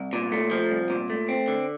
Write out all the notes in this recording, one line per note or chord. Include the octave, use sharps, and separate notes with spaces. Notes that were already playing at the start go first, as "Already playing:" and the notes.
Already playing: C2
A#2
A3
F3
C2
A#2
A3
C4
D3